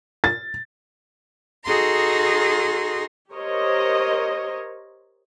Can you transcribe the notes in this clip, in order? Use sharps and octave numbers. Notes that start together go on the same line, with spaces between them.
A6
D#4 F#4 G#4 A4 A#5 C6
G4 A#4 C5 C#5 D#5